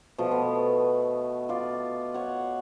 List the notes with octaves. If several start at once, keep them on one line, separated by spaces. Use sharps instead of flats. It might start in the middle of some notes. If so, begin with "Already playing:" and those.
B2 F3 A3
B3
F4 D5
C#5 F#5